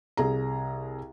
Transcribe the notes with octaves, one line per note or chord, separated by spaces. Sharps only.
C2 G#4 A#5